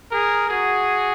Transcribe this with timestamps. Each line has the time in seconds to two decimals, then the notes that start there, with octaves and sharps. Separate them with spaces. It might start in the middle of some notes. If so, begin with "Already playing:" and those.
0.12 G#4 A#4
0.50 F#4 G#4